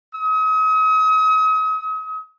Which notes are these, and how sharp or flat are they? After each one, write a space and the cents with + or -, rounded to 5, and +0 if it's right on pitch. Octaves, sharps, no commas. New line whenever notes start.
D#6 +40